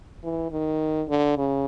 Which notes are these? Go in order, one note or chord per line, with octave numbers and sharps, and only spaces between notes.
E3
D#3
D3
C#3